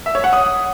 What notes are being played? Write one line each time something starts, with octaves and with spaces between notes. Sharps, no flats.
E5
C#5
F#5
D#6